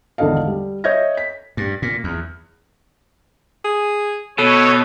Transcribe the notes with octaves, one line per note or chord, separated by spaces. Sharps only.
G#1 E2 D3 A4 D#5 F5
G3
C#5 D#5 E5 G6 G#6 A#6
B6
G2
A#2
E2
G#4
B2 A4 C#5